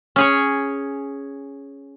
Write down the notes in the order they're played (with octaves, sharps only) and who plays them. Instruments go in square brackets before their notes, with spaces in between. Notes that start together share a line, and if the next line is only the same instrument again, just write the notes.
[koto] C#4 G#4 C#5